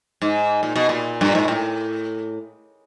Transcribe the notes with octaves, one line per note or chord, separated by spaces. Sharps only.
G#2
A#2
B2
A#2
G2
G#2
A2